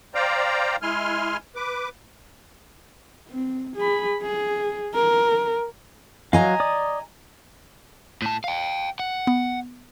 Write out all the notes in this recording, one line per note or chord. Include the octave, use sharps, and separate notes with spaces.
C5 D5 F5 G5 A#5
G#3 E4 G#5 C6 F6
B4 D6
C4
G#4 B5
G#4
A#4
F#3 D#5 F5 G#5 A#5
D5 D#6
A2 A5
F5 G5
F#5
B3